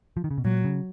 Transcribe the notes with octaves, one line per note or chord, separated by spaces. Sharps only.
F3
D#3
C#3
B2
A#2 F#3
C#3